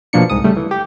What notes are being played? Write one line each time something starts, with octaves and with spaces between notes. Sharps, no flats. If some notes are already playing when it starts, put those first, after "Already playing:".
B2 F3 A#3 D4 C#7
C2 G#2 D#6
C#3 G3 A3
E3
G4